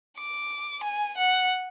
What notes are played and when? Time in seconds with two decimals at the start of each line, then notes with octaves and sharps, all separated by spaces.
0.18 D6
0.83 G#5
1.17 F#5